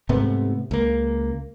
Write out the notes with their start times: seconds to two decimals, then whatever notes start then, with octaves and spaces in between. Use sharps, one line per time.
0.09 G#2 C3 A3 B3
0.71 C#2 A#3